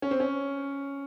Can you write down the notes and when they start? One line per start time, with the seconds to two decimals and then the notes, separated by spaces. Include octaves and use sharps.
0.02 C#4
0.11 C4
0.20 C#4